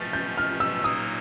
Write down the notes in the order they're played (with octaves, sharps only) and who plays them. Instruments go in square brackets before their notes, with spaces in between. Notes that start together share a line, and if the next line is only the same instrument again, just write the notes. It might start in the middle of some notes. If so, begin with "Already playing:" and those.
Already playing: [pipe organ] F3 A3 C#4 [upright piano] A6
[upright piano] G6
F6
E6
[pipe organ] A#2 F#3 A#3 D#4 [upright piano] D#6